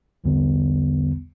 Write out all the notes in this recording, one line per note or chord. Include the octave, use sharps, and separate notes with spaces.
B1 E2 D3 G3 B3